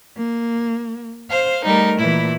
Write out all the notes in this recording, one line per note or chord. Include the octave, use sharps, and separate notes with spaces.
A#3
C5 F5
G3 A3 D#4 A#4
A#2 E3 E4